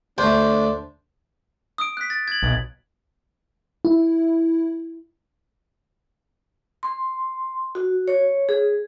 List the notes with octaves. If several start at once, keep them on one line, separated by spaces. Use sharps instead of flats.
D2 A3 D4 C5
D#6 D7
F#6 B6
A6
G#6 F#7
B1
E4
C6
F#4
C#5
G#4